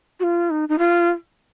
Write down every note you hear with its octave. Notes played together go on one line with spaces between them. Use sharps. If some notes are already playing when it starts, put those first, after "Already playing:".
F#4
F4
D#4
D#4
F4